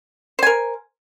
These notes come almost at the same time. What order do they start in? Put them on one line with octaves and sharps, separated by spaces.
C5 G#5 A#4